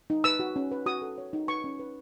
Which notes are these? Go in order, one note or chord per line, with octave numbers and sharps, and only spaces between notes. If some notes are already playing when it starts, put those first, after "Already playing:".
D#4
B4 E6
F#4
C#4
B4
F#4 D#6
A4
C#5
D#4
B4 C#6
C#4
B4